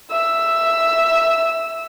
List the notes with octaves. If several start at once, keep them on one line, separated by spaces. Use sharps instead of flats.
E5 E6